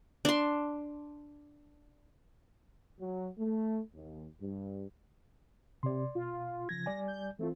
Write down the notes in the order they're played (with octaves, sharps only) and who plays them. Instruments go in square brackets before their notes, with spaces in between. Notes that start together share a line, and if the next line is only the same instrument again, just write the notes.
[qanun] D4 C6
[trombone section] F#3
A3
D#2
G2
[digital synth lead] C3 [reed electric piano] D5 C6
[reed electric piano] B2 [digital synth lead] F4
[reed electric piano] C#3 F3 G#6 [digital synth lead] A#6
[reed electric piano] G3 D5 G#5
[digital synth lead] G6
[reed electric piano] E3 C4 F4 [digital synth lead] A3